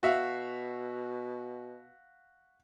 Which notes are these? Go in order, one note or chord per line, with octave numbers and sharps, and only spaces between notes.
B2 F#4 E5 F5